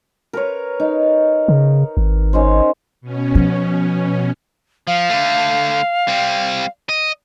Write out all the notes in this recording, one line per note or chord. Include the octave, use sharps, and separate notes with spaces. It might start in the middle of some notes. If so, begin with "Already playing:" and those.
A#4 B4 C#5
D#4
C#3
G#1
C#4 D#4 C5
B2 C#4
F3
F3 F5
D3 A3
G3 C4
D#5